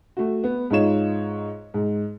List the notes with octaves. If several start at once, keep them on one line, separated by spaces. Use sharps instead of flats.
A3 F#4
B3
G#2 D#4 F4 C#5 E7
G#2